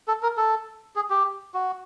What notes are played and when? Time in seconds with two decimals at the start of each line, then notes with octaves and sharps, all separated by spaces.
0.08 A4
0.23 A#4
0.37 A4
0.96 G#4
1.10 G4
1.54 F#4